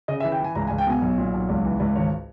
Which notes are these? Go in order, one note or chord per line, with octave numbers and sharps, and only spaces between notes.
C#3 D#5
E5
E3
G5
E3 G#5
C#2 A#5
G#5
C#2
G5
B2 G#5
B1
A#2
B1
C#2
E3
C#2
G#1 C#5